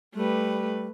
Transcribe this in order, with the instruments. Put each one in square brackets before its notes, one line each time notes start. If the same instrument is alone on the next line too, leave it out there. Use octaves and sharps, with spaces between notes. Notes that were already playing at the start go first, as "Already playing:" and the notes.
[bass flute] G3 [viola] A3 B4